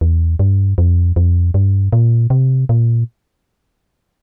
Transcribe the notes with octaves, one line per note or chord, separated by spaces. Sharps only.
E2
G2
F2
F2
G2
A#2
C3
A#2